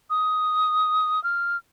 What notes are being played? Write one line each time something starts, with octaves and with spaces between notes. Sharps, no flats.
D#6
F6